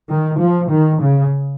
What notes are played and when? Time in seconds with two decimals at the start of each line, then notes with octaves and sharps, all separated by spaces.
0.09 D#3
0.39 F3
0.70 D#3
1.01 C#3